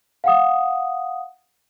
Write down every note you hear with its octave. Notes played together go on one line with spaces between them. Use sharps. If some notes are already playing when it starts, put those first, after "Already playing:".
F5 F#5 D#6